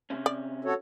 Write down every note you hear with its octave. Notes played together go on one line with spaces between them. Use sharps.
C3 C#4
D5
F#4 A4 C#5